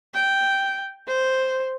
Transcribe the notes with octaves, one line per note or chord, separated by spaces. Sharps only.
G5
C5